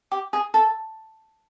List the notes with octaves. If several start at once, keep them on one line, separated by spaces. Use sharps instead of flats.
G4
G#4
A4